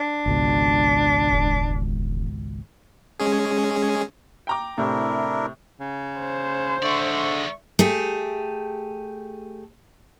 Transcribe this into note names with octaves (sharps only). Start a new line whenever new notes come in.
D4
G#1 C#2 B2
E1
G#3 C#4 G#4
G5 A#5 D6
A2 C3 C4 D4 E4 A#4
C#3
C5
D3 G#3 D5 E5 C#6
A3 G4 G#4